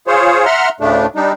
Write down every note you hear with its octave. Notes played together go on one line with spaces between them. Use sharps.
F4 G#4 C5 C#5
E5 F#5 A#5 C6 F6
D2 A2 C#3 A3 D4
G3 D4 D#4